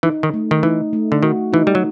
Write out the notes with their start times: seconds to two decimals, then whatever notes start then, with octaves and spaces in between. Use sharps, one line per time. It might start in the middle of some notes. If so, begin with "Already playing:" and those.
0.03 E3 D#4
0.23 D#3
0.34 A3
0.51 D#3
0.63 E3 D#4
0.93 A3
1.12 D3
1.23 D#3 F#4
1.53 E3 D#4
1.67 G3
1.75 F#3